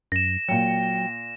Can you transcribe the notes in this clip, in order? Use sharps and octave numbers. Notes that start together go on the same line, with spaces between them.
F#2 A#6 E7
A#2 F#3 G5 C#7